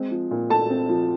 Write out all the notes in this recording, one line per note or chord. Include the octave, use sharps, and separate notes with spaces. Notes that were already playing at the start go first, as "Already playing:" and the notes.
Already playing: G#3 C4
F3
A#2
A3 A5
C4
F3